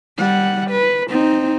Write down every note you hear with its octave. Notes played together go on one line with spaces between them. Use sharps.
G3 F#5
B4
C4 D#4